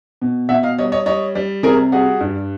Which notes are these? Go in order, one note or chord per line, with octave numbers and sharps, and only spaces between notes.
B2
B2 E5 F#5
D#5 F5
G3 C#5 D#5
C#5 D#5
G3 C#5 D#5
G3
C3 G#4 A#4
G3 F#4 G#4
G2